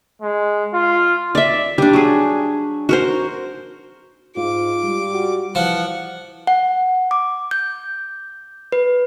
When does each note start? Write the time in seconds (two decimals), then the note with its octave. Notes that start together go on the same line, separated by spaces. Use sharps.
0.22 G#3
0.74 F4
1.35 D5 E5
1.78 G3 D4
1.93 F#3 G#4
2.89 F#4 A#4 C5
4.37 G#2 F4 D6
4.84 G3
5.13 F#4
5.55 E3 F3 F#5
6.47 F#5
7.11 D6
7.51 G6
8.72 B4